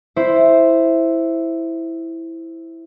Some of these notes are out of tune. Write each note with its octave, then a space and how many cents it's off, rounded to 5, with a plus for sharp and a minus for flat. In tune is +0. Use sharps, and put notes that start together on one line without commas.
E4 +0 C5 +0